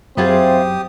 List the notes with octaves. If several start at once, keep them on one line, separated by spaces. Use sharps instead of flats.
F#2 F#3 C4 E4 F4 G4 G#4 D#6